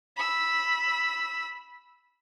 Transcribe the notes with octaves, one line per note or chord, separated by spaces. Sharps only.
B5 E6